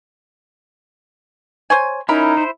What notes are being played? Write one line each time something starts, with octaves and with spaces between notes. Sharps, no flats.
C5 C#5 G#5
C#4 D#4 E4 A#4 B5
E4 C5